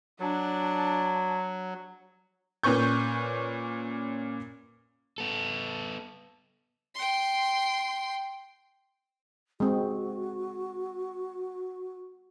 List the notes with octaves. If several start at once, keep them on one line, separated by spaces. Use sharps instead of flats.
F#3 D4 A5
A#2 C#4 B4 C#6 G6
B3 A4
G5 C6
G#3 C4 F#4